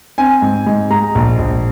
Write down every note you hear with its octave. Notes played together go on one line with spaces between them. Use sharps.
C4 G#5
G#2
G#2
G#3 A#5
A#1
A#1